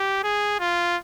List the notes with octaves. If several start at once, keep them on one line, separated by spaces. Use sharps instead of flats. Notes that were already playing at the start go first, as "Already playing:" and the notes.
Already playing: G4
G#4
F4